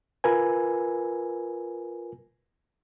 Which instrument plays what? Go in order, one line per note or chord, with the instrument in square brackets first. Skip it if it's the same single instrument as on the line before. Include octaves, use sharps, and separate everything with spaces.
[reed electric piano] F4 A#4 B4 G#5